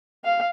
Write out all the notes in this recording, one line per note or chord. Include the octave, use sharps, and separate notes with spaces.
F5